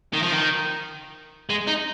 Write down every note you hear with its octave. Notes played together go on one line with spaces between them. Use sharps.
D#3
F3
D#3
G#3
D#4